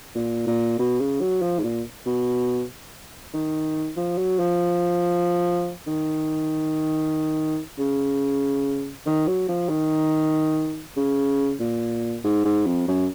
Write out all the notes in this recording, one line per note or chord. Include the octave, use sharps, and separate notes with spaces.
A#2
A#2
B2
C#3
F#3
F3
G#2
A#2
B2
D#3
F3
F#3
F3
D#3
C#3
D#3
F#3
F3
D#3
C#3
A#2
G#2
G#2
F2
F#2